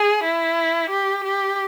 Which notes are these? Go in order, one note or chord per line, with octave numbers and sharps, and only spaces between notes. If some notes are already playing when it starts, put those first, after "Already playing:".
Already playing: G#4
E4
G4
G4